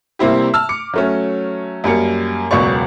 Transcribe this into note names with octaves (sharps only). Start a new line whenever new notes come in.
C3 G3 A#3 C4 E4 G4
A5 E6 F6
D6 C#7
F#3 A3 C#4
F#2 G3 A#3 C#7
E1 C#2 F#3 B3 D5 C#6